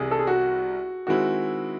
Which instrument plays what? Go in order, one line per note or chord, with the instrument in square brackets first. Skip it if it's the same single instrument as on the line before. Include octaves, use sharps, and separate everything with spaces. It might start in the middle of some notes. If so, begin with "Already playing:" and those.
Already playing: [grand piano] C2 C3 E3 [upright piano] G#4
[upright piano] A4
G#4
F#4
[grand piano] D#3 G#3 C4 E4 [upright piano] F#4